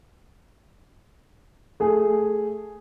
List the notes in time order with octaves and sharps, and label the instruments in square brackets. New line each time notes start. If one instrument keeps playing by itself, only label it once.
[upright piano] A3 G#4